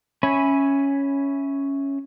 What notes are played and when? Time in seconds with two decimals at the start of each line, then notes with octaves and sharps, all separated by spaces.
0.23 C#4 C#5 E5 G#5 B5